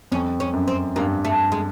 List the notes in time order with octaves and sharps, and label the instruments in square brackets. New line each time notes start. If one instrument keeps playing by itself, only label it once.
[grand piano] F2 [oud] C#4
[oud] C#4
[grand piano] F#2
[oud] C4
[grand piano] G2 [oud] A#3
[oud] A3
G#3